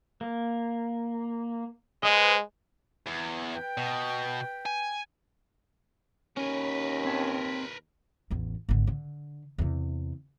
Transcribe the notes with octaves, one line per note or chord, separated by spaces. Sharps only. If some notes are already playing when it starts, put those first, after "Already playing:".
A#3
G#3 B4 C5 D#5
E2
B4 G5
B2
G#5
D#2 C#4 A#4 B4
C4 C#5 A5
A1 E2
G#1 D3
D3
E2 C3